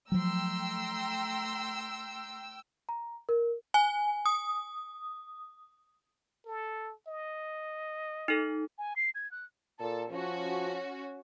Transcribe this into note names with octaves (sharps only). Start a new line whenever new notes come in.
F3 F#3 A3 G5 A#5 C6 E6
A#5
A#4
G#5
D#6
A4
D#5
D#4 A4
G#5
C7
G#6
F#6
A#2 A4
F3 C#4 F#4